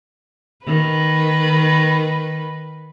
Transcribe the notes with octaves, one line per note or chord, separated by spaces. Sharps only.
D#3 B4